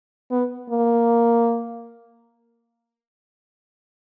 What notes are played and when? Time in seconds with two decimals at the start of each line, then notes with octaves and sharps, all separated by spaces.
0.31 B3
0.70 A#3